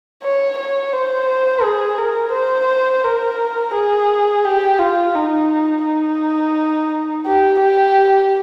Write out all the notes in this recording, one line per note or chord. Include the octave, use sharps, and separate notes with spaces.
C#5
C#5
C5
G#4
A#4
C5
A#4
G#4
G4
F4
D#4
D#4
G4
G4